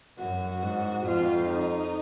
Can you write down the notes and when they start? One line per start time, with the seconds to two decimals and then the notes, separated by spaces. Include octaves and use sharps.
0.18 F#2 F#4
0.62 G#2
1.06 F2 F4
1.50 D#4